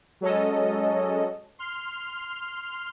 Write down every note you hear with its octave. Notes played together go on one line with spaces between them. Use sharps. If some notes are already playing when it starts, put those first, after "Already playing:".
F#3 G#3 C#4 A4 D#5
C6 F6